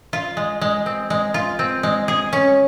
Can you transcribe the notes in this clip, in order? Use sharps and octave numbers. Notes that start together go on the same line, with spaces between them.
F4
G#3
G#3
C4
G#3
F4
C4
G#3
G#4
C#4